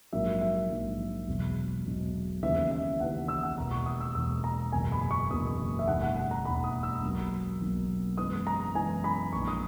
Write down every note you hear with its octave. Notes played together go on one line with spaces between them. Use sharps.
A#1 G#2 F#3 A#3 E5
E5
A#1 G#2 F#3 A#3
E1 E2 B2 F#3
E1 E2 B2 F#3
D#2 C#3 E3 B3 E5
E5
D#2 C#3 E3 B3 F#5
E6
F#5
E1 E2 B2 A#3 A#5
C#6
D#6
E6
E1 E2 B2 A#3 E6
A#5
F#1 E2 B2 A#3 G#5
B5
C#6
F#1 E2 B2 A#3 D#6
E5
E1 D#2 D#3 F#5
F#5
F#5
A#5
E1 D#2 D#3 B5
D#6
E6
B1 B2 F#3 A#3
B1 B2 F#3 A#3
F#2 E3 G#3 B3 D#6
A#5
F#2 E3 G#3 B3 G#5
B5
A#1 A#2 G#3 C#6
D#6